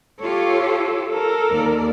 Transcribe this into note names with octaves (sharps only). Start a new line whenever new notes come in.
F4 G4 A4 C#5
A4 A#4
D#2 D5